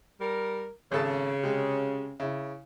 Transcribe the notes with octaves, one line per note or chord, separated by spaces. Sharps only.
G3 A#4
G#1 C#3 A4 A5
C3 G#3
C#3 E4